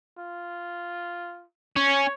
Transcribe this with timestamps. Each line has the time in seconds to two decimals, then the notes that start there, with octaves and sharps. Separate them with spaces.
0.18 F4
1.76 C#4 C#5